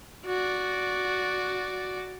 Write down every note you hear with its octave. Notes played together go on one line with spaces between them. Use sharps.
F#4 D5